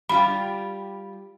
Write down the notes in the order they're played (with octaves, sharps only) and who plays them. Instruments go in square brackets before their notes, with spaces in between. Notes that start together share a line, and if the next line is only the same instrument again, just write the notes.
[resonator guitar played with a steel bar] G3 F4 G4 [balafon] B5